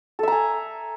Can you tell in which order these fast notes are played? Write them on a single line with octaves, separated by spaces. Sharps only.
A4 E5 A#5 G#5